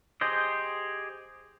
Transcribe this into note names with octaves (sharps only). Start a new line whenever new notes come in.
G4 G#4 C5 D#5